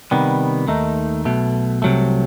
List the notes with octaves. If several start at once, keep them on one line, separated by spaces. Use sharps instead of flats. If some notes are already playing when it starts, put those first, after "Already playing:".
C3 D#3 G3 B3
D#2 D#3 A3 D#4
B1 B2 A3
C2 C3 F#3 A3